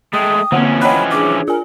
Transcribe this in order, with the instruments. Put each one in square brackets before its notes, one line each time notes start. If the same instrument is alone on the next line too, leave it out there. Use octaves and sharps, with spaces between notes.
[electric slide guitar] G#3 A3 [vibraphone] G5 [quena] D#6
[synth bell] D3 F#5 [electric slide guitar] E3 F3 C#4 [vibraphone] A#3 C4
[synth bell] C#5 F#6 [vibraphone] D#5 F#5 G5 [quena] B5
[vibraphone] D4 G#4 [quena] D6
[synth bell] F4 G#5 [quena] A#4